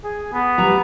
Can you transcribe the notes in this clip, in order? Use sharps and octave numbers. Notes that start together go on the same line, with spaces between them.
G#4
B3
G3 B4 A#5